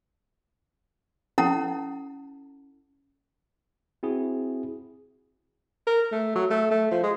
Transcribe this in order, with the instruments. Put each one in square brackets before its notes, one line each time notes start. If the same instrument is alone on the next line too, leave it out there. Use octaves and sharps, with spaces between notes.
[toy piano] C#4 E4 A4 F#5 A5 A#5
[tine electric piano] C4 E4 F#4 G#4
[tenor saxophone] A#4
A3
F#3
A3
A3
F3
G#3